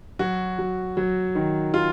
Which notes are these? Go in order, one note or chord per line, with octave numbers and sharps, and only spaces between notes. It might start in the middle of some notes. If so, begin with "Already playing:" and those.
F#3 F#4
F#3
F#3
D#3
F4